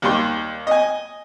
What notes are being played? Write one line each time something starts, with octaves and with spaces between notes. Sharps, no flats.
D#2 G3 G5 C6
D#5 G#5